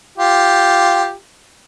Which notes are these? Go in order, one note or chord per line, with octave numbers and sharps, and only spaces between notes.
F4 G4